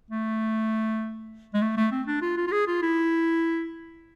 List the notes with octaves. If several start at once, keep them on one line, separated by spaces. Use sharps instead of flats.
A3
G#3
A3
A3
C4
D4
F4
F4
F4
G#4
F4
E4